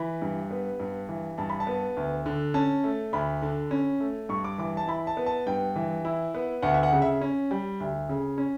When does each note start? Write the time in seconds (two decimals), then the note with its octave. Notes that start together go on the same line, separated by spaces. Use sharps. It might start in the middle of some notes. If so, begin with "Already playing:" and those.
Already playing: E3 B5
0.22 G2
0.51 B3
0.80 G2
1.09 E3
1.38 G2 A5
1.50 B5
1.60 A5
1.67 B3
1.97 D2
2.26 D3
2.54 C#4 A5
2.84 A3
3.13 D2 B5
3.42 D3
3.71 C#4
4.00 A3
4.29 G2 C#6
4.44 D6
4.58 E3 D6
4.77 A5
4.87 E4 B5
5.07 A5
5.17 B3
5.26 A5
5.47 G2 G5
5.76 E3
6.05 E4
6.35 B3
6.62 D2 F#5
6.74 E5
6.83 F#5
6.92 C#3
7.02 E5
7.21 C#4
7.51 G3
7.80 D2
8.09 C#3
8.38 C#4